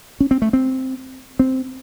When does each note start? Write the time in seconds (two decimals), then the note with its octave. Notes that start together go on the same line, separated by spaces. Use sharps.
0.20 C#4
0.31 C4
0.42 A3
0.53 C4
1.39 C4